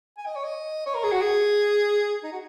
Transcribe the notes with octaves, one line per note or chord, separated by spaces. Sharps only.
G#5
D#5
C#5
D#5
C#5
A#4
G#4
F#4
G#4
D#4
F#4